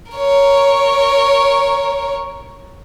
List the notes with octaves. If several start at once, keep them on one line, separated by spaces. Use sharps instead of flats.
A#4 C#5